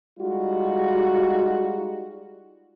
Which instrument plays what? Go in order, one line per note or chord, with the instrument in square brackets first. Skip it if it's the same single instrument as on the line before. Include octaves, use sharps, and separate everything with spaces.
[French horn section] G3 G#3 D#4 F4 F#4